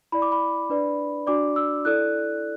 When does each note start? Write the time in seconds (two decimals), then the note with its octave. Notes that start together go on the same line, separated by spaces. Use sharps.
0.12 E4 D5 B5
0.22 D6
0.32 B5
0.70 D4 B4 D5
1.27 D4 F#4 D5 D6
1.56 E6
1.85 E4 A4 D5 F#6